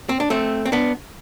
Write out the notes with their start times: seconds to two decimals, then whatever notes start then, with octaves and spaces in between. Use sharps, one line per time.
0.09 C4
0.20 D4
0.30 A3 C4
0.66 C4
0.72 B3 D4